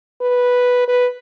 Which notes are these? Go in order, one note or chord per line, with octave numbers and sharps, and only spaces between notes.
B4
B4